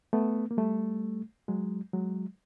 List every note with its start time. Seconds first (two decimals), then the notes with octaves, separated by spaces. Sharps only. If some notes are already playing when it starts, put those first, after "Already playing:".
0.13 A3 B3
0.51 A#3
0.57 G3 A3
1.48 F#3 G#3
1.93 F#3 G#3